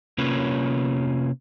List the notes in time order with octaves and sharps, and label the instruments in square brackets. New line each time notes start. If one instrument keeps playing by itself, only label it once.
[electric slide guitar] C3 A#3 C#4 F4 B4 C#5